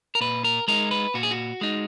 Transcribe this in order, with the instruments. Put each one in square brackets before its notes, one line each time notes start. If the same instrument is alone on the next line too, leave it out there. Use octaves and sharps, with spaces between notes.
[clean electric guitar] A#4
A#2 B4
A#4
G#3 D#4 A#4
B4
A#2 F#4
G#4
F#4
G#3 D#4